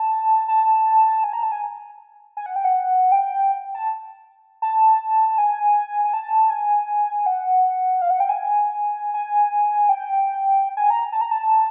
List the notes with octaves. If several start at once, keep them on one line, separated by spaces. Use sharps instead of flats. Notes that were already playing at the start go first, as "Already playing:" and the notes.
Already playing: A5
A5
G#5
A#5
A5
G#5
G#5
F#5
G5
F#5
G5
A5
A5
G#5
G#5
A5
G#5
F#5
F5
F#5
G5
G#5
G#5
G5
G#5
A#5
A5
A#5
A5